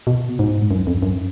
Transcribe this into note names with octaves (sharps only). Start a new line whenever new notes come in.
B2
G#2
F#2
F2
F#2